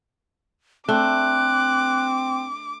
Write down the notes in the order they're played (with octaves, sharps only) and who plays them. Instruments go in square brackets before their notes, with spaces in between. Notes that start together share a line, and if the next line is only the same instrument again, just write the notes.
[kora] A3 D4 [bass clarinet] C4 [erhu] D6 [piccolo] F#6